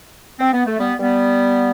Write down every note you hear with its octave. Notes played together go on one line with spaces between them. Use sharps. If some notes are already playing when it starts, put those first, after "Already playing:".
C4
B3
A3
G3 B3
G3 B3